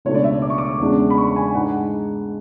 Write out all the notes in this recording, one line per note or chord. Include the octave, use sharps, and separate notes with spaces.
C#2 B2 A3 D4 C#5
D5
E5
D6
C#6
D6
E2 C#3 G#3 D4
B5
C#6
B5
G#5
G#2 G#3 D4 F#5